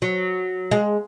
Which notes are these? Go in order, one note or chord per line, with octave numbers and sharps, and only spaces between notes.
F#3
G#3